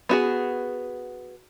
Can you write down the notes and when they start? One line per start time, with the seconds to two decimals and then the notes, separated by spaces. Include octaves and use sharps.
0.09 B3 F#4 G#4